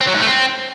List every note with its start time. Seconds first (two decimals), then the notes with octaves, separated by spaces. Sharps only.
0.01 C4
0.07 F#3
0.14 G#2
0.20 A3
0.26 C4